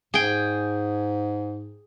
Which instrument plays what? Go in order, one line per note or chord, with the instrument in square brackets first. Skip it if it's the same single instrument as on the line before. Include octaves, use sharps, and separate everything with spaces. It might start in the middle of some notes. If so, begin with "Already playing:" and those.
[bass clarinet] G#2 [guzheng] G#4 G5